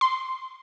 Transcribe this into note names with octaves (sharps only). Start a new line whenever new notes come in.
C6